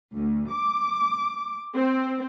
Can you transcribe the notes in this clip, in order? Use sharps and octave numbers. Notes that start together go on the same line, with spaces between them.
D2
D6
C4